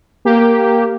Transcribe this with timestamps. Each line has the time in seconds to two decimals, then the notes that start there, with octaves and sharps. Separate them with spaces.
0.25 A#3 G4